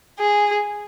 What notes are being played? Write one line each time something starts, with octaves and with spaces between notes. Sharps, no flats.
G#4